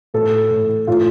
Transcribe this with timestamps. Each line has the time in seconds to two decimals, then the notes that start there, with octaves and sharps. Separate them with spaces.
0.14 A2 A4
0.51 A2
0.87 A2 F4